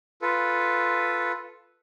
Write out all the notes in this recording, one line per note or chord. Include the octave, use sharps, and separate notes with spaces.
F4 A4 B4